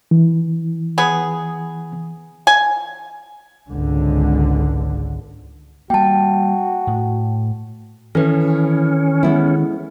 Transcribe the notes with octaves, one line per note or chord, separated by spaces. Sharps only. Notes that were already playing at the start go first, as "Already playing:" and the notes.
E3
B3 G#4
G#5
G#1 C#2 D3
G3 A#3 F#4 G5 A5
A2
D#3 E3 C#4 A4 B4
G#3 B3 E4